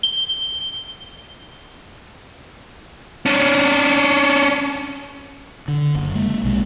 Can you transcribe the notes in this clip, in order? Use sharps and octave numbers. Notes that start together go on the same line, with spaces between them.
G7
C#4 D4
D3
F#1
G#3 A#3
B1 C3 G#3